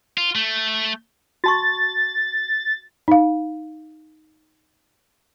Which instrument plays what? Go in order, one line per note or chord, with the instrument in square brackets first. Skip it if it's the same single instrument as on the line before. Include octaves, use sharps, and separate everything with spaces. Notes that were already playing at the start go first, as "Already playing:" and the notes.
[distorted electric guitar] F4
A3
[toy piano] F#4 A5 C#6 [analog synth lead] A6
[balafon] D#4 F5